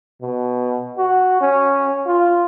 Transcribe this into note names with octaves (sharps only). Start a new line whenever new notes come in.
B2
F#4
C#4
F4